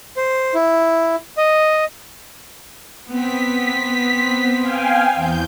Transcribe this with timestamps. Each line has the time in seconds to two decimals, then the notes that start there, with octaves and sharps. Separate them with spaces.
0.17 C5
0.55 E4
1.37 D#5
3.11 B3 C4 B6
4.61 F5 G5 G#5
5.15 E2 G6